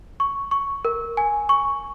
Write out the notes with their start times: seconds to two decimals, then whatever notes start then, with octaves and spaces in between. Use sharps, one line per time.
0.20 C#6
0.51 C#6
0.85 A#4
1.17 G#5
1.49 C#6